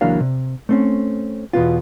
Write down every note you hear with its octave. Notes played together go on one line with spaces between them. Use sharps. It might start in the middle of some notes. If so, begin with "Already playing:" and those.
C#2 E3 F#3 A#3 D4 F5
C3
A3 C4 C#4
E2 B2 B3 F4